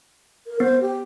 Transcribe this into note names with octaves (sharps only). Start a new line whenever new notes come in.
A#4
B3 C5
G4